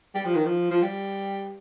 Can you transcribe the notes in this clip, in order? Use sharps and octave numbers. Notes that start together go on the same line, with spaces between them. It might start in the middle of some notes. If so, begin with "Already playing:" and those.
G3
F3
D#3
F3
F3
G3